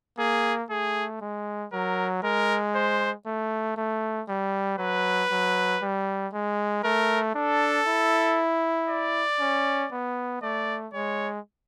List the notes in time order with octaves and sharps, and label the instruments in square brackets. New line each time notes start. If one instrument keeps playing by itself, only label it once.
[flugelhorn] A#3 [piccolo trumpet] G#4
[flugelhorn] A3 [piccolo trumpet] G#4
[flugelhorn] G#3
[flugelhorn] F#3 [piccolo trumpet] A#4
[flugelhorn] G#3 [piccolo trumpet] A#4
[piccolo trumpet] C5
[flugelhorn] A3
A3
G3
[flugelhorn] F#3 [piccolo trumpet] B4
[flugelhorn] F#3
G3
G#3
[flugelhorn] A3 [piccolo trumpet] A#4
[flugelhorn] D4 [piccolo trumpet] A4
[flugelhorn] E4
[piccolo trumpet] D5
[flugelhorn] C#4
B3
[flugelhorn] A3 [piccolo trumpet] D5
[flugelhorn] G#3 [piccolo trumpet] C#5